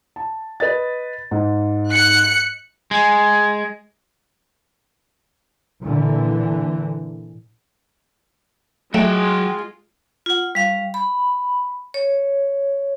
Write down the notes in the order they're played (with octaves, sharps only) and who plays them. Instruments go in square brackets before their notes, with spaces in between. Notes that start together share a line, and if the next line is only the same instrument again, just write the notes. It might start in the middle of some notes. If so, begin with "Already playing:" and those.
[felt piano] A5
B4 D#5 A6
G#2
[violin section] F#6 C#7
[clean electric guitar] G#3
[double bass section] A#2 D3 E3
[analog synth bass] F#3 [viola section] G#3 F4 [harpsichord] A3 [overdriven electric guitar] F#4 G5
[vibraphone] F4 F#5
G3 F5
B5
C#5